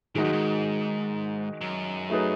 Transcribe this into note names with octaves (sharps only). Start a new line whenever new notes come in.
G#2 D#3 G#3 D#4 F#4
F#2
G#2
F#2
F#3 A3 D#4 G#4 B4